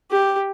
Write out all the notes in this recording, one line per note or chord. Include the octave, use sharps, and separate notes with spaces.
G4